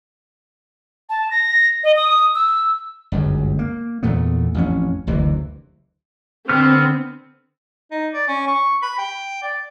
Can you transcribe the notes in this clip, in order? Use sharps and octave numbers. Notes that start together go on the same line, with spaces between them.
A5
A#6
D#5
D#6
E6
G1 C#2 F#2
A#3
E2 A#2 A3 B3
A1 F2 B3 C#4
F#1 D2 C3 E3
D3 B3 C4 F6
D#4
D5
C#4
C#6
B5
G5
D5